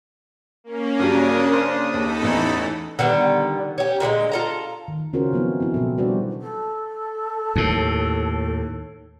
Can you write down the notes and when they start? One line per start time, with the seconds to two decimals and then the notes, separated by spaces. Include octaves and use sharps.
0.64 A#3 C#4
0.99 G2 C#3 F#3 D4 G4 D#6
1.53 C5
1.94 D#2 D#4 A4 B5
2.22 A1 E2 A2 E3
2.99 D3 D#3 G3 B3
3.78 C#4 G4
4.00 A#2 D3 E3 G#3
4.31 F4 A4 A#5
4.88 D#3
5.13 C#3 C#4 F4 F#4 A#4 C5
5.33 F3 F#3 B3 C4 D#4 E4
5.60 C4 E4
5.74 B2 F#3 B3 A4
5.98 G3 D4 F#4 B4 C5 D5
6.41 A4
7.56 D#2 A2